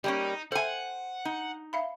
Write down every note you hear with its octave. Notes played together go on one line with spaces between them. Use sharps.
G3 A#3 C#4 D#4
A4 C5 E5 F#5 G#5
D#4
E5 F5 B5